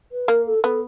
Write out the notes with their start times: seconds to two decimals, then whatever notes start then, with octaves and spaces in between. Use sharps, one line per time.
0.11 B4
0.28 A#3 A#4
0.46 A4
0.63 B3 A4